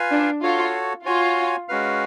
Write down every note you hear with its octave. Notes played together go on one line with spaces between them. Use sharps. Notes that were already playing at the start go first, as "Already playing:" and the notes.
Already playing: F4 B4 F5 G#5
D4
F4 F#4 A4 C#5
F4 F#4 C#5 G#5
G#3 C#4 F#4 B4 F5